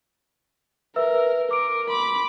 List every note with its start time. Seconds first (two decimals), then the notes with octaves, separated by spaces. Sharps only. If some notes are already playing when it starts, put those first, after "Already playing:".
0.96 A#4 B4 E5 E6
1.51 A#4 D6 D7
1.89 B5 C6 D6